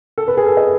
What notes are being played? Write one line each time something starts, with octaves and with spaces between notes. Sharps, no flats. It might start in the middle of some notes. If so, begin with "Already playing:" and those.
A4
B4
G#4
A4
D#5